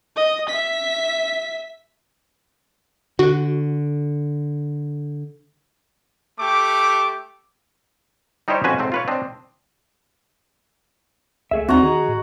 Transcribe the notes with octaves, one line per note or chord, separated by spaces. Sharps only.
D#5
E5 B6
D3 F#4
A3 G4 D6
G3 D#4 E4 G4 C5 C#5
F2 C#4 F#4 B4 C5 G#5
G#2 C3 A3 C4
F4 B4 C#5
C4 D4 D#5
C#2 A3 G#4 E5
D#2 C4 D4 D#4 F#4 A#5
D#3 G#4 D#5
A2